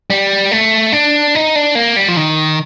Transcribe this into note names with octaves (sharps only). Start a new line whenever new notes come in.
G3
A3
D4
D#4
D4
A#3
G3
F3
D#3